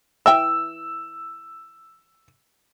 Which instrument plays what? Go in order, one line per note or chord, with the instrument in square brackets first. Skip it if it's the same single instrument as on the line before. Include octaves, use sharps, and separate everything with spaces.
[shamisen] E3 E5 G5 [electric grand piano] E6